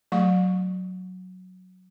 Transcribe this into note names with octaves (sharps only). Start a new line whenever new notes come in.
F#3 A3 C#6